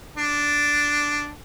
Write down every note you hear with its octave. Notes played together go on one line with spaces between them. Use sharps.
D4